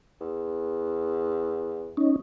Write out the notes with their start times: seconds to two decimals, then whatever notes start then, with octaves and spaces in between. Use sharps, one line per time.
0.20 E2
1.97 C#4 D#4